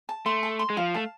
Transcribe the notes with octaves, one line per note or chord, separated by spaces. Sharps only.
A5
A3 C6
A5
C6
G#3
F3 F5
A3 A5